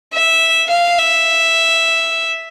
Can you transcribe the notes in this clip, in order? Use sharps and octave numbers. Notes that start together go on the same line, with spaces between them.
E5
F5
E5